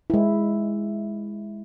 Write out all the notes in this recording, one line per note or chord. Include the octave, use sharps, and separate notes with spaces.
G#3 E4